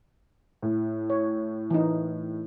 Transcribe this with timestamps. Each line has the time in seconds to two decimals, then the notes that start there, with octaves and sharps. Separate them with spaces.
0.62 A2
1.10 C#5
1.70 E3 D#4